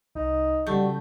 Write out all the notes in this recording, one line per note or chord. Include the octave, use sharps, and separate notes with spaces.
C2 D#4
C#3 G3 A3 F#4 G6